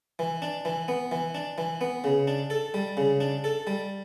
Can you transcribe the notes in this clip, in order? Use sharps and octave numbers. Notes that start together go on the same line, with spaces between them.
E3
D4
E3
B3
E3
D4
E3
B3
C#3
D4
A4
G3
C#3
D4
A4
G3